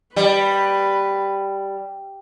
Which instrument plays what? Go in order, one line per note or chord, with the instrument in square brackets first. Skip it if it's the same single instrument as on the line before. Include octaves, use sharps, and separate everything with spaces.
[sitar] G3 [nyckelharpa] B4